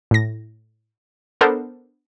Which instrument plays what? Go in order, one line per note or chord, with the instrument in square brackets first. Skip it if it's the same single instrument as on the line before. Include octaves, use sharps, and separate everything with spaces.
[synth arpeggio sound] A2 A#6
B3 D4 A4 A#4 C5